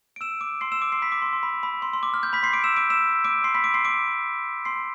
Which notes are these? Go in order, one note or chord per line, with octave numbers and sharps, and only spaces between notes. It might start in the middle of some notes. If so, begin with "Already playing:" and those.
D7
E6 E7
D6 D7
C6 C7
E6 E7
D6 D7
C6 C7
B5 B6
D6
C6
C6
B5
B5
C6
C6
D6
F6
G6
B5 B6
C6 C7
D6 D7
E6 E7
D6 D7
E6 E7
D6 D7
C6 C7
B5 B6
D6 D7
C6 C7
D6 D7
C6 C7